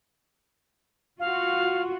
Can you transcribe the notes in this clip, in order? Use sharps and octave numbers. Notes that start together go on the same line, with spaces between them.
F4 F#4 F5